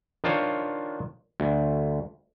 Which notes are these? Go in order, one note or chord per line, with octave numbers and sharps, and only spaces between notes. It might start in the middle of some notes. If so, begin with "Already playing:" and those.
D#3 D4 F4 C5 C#5
D2